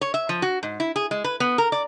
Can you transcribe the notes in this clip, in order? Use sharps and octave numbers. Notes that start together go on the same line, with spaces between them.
C#5
E5
F3
F#4
G#2
E4
G#4
G#3
B4
B3
A#4
D5